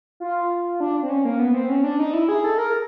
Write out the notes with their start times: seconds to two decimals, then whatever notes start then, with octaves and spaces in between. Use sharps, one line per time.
0.20 F4
0.80 D4
1.03 C4
1.09 C#4
1.25 A#3
1.39 B3
1.54 C4
1.69 C#4
1.84 D4
2.00 D#4
2.13 E4
2.29 G#4
2.44 A4
2.58 A#4